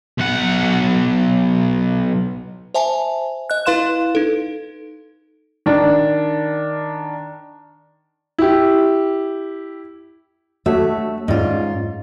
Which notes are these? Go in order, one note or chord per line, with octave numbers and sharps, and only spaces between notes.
B1 F#5
C5 E5 G#5 A5
D#5 F#6
E4 B4 F5 C6 F#6 E7
D#4 A4
D#3 D4
E4 G4
A3 D4 F#4 C#5 E5
G#2 C#4 F4 D5 D#5